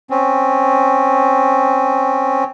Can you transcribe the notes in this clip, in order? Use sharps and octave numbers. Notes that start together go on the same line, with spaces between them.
C4 C#4